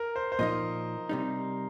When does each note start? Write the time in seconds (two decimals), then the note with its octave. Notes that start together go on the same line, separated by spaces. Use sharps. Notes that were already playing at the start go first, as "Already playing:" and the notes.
Already playing: A#4
0.16 C5
0.32 C5
0.39 A#2 F3 D#4 D#5
1.09 C3 G3 D#4